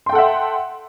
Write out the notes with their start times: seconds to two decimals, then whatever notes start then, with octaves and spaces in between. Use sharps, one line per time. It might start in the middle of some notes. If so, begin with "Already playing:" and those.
0.06 C6
0.09 G5
0.12 A4
0.15 F#5
0.18 E5